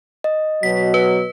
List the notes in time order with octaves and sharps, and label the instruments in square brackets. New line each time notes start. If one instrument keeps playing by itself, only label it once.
[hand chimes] D#5
[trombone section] B2 F#3 [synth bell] B6
[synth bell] B4